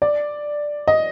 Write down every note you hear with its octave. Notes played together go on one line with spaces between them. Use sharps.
D5
D#5